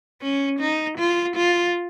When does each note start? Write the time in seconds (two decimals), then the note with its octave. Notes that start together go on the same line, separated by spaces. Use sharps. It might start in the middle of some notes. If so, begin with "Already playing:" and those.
0.22 C#4
0.60 D#4
0.99 F4
1.37 F4